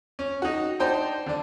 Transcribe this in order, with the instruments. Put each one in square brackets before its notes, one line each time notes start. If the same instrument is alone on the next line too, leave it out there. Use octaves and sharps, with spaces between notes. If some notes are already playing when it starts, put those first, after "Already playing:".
[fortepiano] C#4
D#4 F#4
D4 D#4 C5 G5 C6
D3 D4